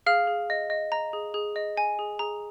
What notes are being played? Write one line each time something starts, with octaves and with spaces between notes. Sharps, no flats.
G#4 F5 F6
G#4
D#5
D#5
D#5 A#5
G#4
G#4
D#5
D#5 G#5
G#4
G#4 A#5